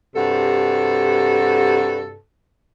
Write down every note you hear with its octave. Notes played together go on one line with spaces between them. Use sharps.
G2 C3 F#4 A4